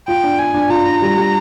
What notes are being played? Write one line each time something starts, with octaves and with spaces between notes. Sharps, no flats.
F4 G5
D4
D4 G#5
D4
F4 A#5
D4
G3
G3